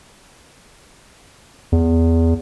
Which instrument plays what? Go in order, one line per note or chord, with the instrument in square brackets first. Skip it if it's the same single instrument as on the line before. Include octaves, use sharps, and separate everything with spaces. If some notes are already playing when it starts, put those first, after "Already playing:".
[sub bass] E2